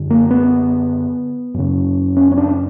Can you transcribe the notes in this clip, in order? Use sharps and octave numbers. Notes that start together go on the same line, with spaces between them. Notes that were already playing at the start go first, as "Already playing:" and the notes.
Already playing: F#2 D3
A#3
B3
F#2 C#3
C#4
C#4
D4